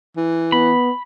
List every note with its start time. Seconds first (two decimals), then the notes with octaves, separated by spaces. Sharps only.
0.17 E3
0.52 B3 B5